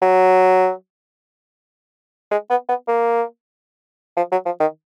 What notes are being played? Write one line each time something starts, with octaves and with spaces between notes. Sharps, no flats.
F#3
G#3
B3
B3
A#3
F3
F#3
F3
D#3